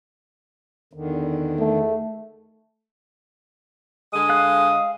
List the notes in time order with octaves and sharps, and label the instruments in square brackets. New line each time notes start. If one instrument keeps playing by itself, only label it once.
[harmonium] E2 D3 D#3
[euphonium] A3
[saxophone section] D3 G#3 [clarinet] D#6
[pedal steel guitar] F5 F#6